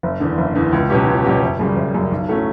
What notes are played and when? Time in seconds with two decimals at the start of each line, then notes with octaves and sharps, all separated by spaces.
0.03 F#1
0.20 E2 D3
0.38 F#1
0.55 E2 D3
0.73 C#2
0.90 B2 F#3 C#4 G4
1.07 C#2
1.24 B2 F#3 C#4 G4
1.42 F#1
1.59 F#2 C#3 G3
1.76 F#1
1.94 F#2 C#3 G3
2.12 B1
2.28 A2 F#3 A3 C#4